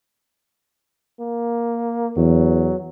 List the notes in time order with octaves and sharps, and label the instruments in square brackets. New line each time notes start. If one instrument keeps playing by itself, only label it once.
[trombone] A#3
[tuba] E2 [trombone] F#3